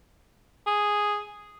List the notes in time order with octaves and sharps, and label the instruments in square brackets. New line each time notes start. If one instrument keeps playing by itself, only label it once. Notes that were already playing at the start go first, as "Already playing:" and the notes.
[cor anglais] G#4